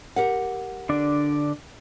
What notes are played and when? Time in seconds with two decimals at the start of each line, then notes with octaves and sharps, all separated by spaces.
0.16 G4 A#4 F#5
0.89 D3 D4 D5